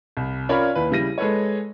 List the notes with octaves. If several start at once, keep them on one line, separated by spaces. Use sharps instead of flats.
C2
C#4 F4 A#4 C#5 D5 B5
D#2 E4 B4
C#3 G3 E4 A#6 D#7
G#3 A4 B4 C#5